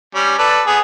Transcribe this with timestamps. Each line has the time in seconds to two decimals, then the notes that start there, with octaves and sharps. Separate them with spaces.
0.15 G3 C#4
0.38 A4 B4 D5
0.67 B3 G#4